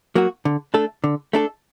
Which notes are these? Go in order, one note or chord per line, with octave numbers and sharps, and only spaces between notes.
F#3 A#3 F#4
D3
A3 D4 A4
D3
A3 D4 A4